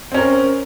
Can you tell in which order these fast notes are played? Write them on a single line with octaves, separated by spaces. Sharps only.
C4 C#4 A#4